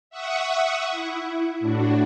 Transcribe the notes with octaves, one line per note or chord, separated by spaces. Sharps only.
E5 F#5 C#6 D#6
E4
A2 D4 F#4